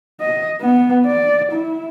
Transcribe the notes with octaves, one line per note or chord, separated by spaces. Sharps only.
D#5
B3
D5
E4